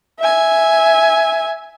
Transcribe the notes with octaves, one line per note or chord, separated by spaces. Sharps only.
E5 G#5